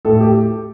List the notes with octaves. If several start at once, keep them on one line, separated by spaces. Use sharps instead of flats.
A2 A4
G4